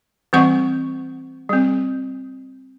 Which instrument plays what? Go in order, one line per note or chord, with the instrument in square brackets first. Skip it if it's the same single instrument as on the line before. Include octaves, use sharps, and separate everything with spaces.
[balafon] E3 G3 C4 F#5 C#6
G3 C4